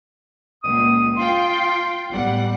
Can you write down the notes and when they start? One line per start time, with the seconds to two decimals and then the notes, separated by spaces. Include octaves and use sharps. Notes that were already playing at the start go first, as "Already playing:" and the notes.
0.64 C#2 A#2 D#6
1.17 F4 G5 C6
2.11 A1 G3 B3 F#5